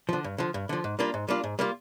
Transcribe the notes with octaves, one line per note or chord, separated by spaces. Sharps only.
D3 F3
G2
D3 F3
G2
D3 F3
G#2
G3 A#3 D4 F4
G#2
G3 A#3 D4 F4
G#2
G3 A#3 D4 F4